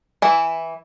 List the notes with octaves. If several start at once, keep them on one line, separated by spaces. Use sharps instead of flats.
E3 E4